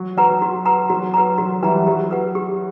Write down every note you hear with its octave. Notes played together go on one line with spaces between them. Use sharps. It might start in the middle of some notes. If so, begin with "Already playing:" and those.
Already playing: F#3
F#3 B4 F#5 A#5
F#4
B4 F#5 A#5
F#3 F#4
B4 F#5 A#5
F#3 F#4
E3 G3 B4 F#5 A#5
F#3 G4
B4 F#5
G4